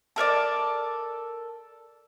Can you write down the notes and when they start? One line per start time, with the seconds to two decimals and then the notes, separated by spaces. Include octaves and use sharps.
0.16 A4 A#4 C#5 D5